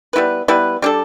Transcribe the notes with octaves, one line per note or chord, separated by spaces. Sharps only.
G3 B3 E4 B4
G3 B3 E4 B4
G3 D4 A4